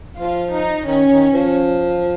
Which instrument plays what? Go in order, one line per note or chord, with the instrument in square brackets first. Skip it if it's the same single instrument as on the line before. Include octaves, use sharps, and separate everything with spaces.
[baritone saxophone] F3 [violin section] F4
[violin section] D#4
[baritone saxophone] D#3 [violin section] C#4
[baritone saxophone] D#3
F3